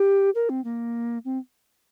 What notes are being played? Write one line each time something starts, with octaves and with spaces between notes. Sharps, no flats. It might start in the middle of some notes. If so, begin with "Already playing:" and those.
Already playing: G4
A#4
C4
A#3
C4